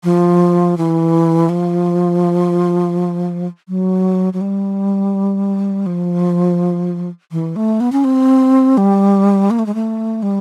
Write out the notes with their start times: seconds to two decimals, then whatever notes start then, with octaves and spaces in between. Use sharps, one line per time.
0.04 F3
0.78 E3
1.49 F3
3.69 F#3
4.33 F#3
4.41 G3
5.86 F3
7.32 E3
7.56 A3
7.80 B3
7.92 C#4
8.04 C4
8.77 G3
9.51 A#3
9.59 A3
9.66 G#3
9.75 A3
10.23 G3